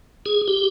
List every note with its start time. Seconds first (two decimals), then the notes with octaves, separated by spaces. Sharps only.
0.26 G#4
0.48 G4